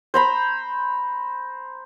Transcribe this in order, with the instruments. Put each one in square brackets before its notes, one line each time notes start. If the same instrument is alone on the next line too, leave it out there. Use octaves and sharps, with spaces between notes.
[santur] C5 A#5 B5